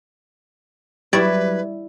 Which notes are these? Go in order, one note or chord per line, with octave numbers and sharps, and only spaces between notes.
F#3 G3 E4 B4 D5 G#6